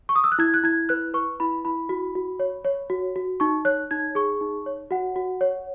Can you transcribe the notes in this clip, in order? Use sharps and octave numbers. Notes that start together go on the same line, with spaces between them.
C#6
D#6
E6
F#6
E4 G#6
F#6
E4 G#6
B4 F#6
B4 C#6
E4 B5
E4 B5
F#4
F#4
C#5
C#5
F#4
F#4
D#4 C#6
C#5 F#6
D#4 G#6
G#4 C#6
D#4
C#5
F#4 F#5
F#4
C#5